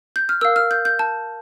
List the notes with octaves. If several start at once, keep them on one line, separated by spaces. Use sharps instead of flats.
G6
F6
A#4 F5 E6
F6
G6
G6
A5